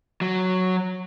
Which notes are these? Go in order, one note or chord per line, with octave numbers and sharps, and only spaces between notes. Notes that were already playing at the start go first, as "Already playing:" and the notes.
F#3